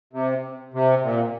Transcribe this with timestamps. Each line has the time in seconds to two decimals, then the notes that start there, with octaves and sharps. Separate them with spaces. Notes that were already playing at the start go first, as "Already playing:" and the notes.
0.13 C3
0.74 C3
1.04 A#2